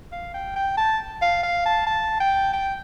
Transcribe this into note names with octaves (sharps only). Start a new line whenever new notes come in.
F5
G5
G5
A5
F5
F5
A5
A5
G5
G5